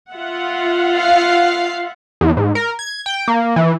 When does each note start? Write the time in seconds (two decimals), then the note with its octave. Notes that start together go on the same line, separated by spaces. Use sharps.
0.10 F4 E5 F#5
0.98 F5
2.21 E2
2.37 G#2
2.55 A#4
2.79 G#6
3.06 G5
3.28 A#3
3.56 E3